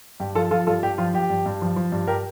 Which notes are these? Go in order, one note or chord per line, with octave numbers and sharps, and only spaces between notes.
G2 G4
F3 F4 A4
F3 F4 A4
G2 F4 A4
G2 G4
F3 F4
F3 G4
G2
G2
F3
F3
G2
G4 A#4